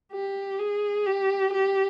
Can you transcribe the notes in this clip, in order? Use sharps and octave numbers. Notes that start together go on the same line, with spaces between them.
G4
G#4
G4
G4